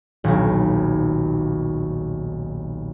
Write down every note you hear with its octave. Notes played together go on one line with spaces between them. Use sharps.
D#1 B1